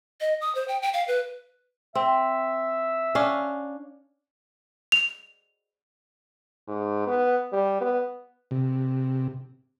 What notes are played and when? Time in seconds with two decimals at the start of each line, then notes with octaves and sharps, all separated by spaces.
0.21 D#5
0.41 D#6
0.55 C5
0.68 G5
0.82 G5
0.94 F5
1.08 B4
1.95 C4 E5
3.15 C#4 D4 F5
4.92 F7
6.68 G#2
7.07 B3
7.53 G3
7.81 B3
8.51 C3